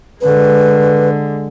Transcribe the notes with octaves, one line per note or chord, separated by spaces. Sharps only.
D3 G#3 B4